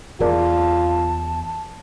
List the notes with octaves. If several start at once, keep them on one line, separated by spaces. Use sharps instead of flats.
E2 F4 G#4 A#4 D5 A5